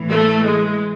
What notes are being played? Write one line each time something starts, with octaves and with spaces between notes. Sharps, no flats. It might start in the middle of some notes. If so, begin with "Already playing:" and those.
Already playing: A2 E3
A3
G#3